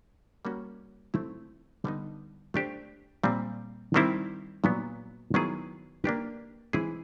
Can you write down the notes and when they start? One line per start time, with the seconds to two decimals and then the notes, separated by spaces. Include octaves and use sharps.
0.45 G3 A#3 C#4 F#4
1.14 A3 C4 E4
1.84 D3 G3 B3 D#4
2.54 A3 D4 G4 C5
3.24 A#2 G3 C4
3.94 D#3 G3 C4 E4
4.64 A#2 F#3 B3
5.34 D#3 F#3 B3 E4 G#4
6.04 A#3 D4 G4 B4
6.73 E3 G#3 C4 E4 G#4